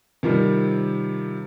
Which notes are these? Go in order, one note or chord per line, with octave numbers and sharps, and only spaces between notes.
C3 D#3 F3 G3